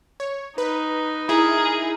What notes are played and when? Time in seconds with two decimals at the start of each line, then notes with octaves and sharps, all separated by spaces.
0.20 C#5
0.58 D#4 B4
1.29 E4 G#4 A#4